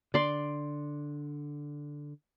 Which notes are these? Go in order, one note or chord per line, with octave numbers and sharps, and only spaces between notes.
D3 D5 C6